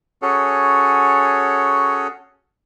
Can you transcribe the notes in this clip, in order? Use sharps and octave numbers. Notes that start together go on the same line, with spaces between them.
C#4 F#4 G#4 A4 C#5